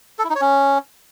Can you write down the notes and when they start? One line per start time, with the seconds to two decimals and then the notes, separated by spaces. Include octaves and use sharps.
0.19 A4
0.24 E4
0.30 D#4
0.35 C#5
0.41 C#4